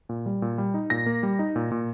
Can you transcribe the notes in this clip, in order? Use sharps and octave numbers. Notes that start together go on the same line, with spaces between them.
A#2
G3
A#2
G3
D#4
A#2 A#6
A#3
G3
D#4
A#2
A#2